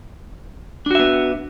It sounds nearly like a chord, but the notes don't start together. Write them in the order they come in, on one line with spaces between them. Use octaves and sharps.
D4 F#4 E5 B3